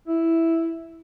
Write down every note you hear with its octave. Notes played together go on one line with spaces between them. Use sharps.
E4